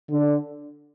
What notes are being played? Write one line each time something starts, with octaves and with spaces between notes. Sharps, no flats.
D3